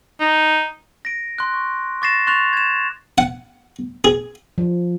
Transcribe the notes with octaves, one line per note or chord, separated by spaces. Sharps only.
D#4
A#6 D7
C6 F#6
C#6
C#6 D6 A6 A#6 C7 E7
C6 C#6 F#6 A6 F7
G#6 E7
F#5
G#4
F3